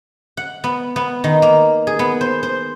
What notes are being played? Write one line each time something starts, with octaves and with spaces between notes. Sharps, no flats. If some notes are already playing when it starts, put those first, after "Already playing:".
F#5
B3
B3
D#3
A#3
G#4
B3
C5
C5